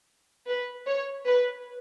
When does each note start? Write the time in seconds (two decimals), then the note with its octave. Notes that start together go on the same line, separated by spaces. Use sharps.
0.48 B4
0.86 C#5
1.26 B4